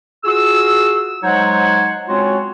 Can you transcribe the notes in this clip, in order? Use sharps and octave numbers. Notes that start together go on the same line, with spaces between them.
F4 F#4 G#4 E6
F#3 G#3 D#4 C5 C#5 F#5
G#3 C4 C#4 F4 F#4 C#5